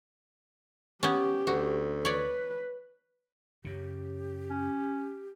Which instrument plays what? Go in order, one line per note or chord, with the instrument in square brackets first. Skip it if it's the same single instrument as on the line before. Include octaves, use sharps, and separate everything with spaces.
[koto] B3 C#4 [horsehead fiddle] G4
[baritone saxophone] D2 [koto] F#4
[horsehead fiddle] B4 [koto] C#5 D5
[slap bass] F#2 C#3 [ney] G4
[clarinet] C#4